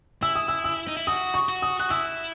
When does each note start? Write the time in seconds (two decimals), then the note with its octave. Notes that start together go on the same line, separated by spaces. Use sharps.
0.23 E4 E6
0.36 D#6
0.48 E6
0.64 E6
0.88 D#4
0.97 E4
1.07 F#4 D#6
1.34 C#6
1.49 F#4
1.62 D#6
1.80 F#4 F#6
1.90 E4 E6